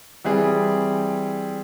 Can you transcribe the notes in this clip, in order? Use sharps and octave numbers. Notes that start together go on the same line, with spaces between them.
E3 G3 C4 G#4